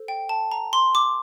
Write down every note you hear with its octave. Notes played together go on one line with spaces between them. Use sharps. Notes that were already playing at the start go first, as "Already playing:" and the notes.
Already playing: A4 C5
G5
A5
A#5
C6
D6